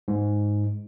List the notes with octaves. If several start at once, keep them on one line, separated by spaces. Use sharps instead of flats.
G#2